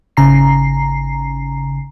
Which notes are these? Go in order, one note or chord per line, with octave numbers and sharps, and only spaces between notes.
G#1 C#3 A#5 C7